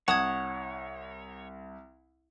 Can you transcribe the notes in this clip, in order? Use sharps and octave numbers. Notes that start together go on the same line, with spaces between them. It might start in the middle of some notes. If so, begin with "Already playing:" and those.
C2 C#5 F#5 A5 D#6 G#6